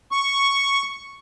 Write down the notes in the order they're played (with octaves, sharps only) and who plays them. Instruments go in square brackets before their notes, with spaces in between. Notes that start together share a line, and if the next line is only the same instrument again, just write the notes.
[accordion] C#6